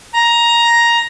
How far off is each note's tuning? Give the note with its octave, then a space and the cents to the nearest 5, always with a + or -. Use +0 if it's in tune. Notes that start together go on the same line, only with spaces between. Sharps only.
A#5 +10